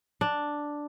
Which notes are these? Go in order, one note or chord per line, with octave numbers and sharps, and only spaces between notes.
D4